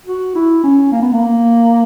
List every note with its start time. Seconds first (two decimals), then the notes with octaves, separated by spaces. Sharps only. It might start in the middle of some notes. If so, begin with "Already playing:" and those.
0.06 F#4
0.35 E4
0.64 C#4
0.92 A#3
1.02 B3
1.13 A#3